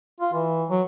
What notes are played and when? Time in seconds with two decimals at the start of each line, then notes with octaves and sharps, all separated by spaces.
0.20 F4
0.33 E3
0.69 F#3